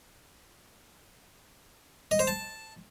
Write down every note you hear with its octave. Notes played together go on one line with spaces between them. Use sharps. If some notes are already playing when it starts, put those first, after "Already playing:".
D#5
C5
A5